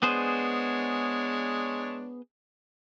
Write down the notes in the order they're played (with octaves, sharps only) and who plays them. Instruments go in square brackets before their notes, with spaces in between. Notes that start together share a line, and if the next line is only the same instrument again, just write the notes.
[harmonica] G#3 D4 C#5 [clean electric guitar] B3 G#4 C5